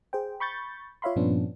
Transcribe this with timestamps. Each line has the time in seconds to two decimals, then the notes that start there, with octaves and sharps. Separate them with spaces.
0.13 G#4 C5 G5
0.40 B5 C#6 G6 A6
1.02 F4 C#5 E5 F5 B5 C6
1.16 G2 A#2 F3 B3 C#4 D4